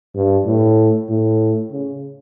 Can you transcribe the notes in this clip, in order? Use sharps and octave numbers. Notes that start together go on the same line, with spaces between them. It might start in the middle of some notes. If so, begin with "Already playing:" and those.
G2
A2
A2
C#3